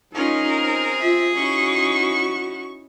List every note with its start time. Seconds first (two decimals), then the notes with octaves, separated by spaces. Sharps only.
0.15 C#4 D#4 F4 G#4 A#4
0.61 C4
1.01 F4 E5
1.36 C#4 D#4 E4 F#4 C#6